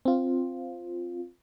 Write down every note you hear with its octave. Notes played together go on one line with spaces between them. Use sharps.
C4 F4